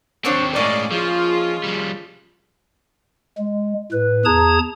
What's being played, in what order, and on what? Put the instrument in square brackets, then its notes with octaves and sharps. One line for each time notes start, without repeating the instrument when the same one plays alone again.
[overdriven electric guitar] D#2 C4 [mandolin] D4 C5 C#5
[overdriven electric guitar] A2 G#3 [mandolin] A#3 C#4 D#5 [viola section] D5
[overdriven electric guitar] F3 [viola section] F4 G#4
[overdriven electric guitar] F3 G3
[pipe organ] G#3
A2 B4
E2 G#4 A5 A#5 D#6 G#6